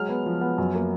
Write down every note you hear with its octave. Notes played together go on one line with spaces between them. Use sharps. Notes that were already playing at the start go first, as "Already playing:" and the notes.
Already playing: F#3 G#3 F6
B3
F3
B3
F#2
A#3